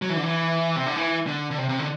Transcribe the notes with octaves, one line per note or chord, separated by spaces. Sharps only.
F#3
E3
D3
E3
C3
D3
E3
D3
D3
C3
C3
D3